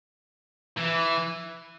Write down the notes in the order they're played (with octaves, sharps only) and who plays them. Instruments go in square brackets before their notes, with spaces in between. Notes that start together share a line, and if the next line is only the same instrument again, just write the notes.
[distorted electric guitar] E3